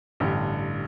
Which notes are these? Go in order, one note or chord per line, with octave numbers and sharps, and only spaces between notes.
A1 G2 D3 G4